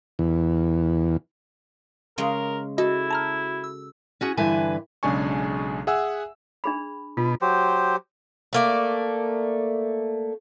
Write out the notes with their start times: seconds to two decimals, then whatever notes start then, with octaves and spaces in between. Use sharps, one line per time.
0.19 E2
2.18 C#3 G#3 A#4
2.78 E4 F#4 A4 D#5
3.11 A5 A#5 F6
3.64 E6
4.21 C#4 F#4 G#4
4.37 G2 D3 E3 B4 E5 G#5
5.03 B1 C#3 G#3 D4 G#5 C#6
5.87 G#4 E5 F#5 G#5 E6
6.64 D4 G#4 B5
7.17 B2 F4
7.41 F#3 G4 C5
8.53 A3 A#3 D5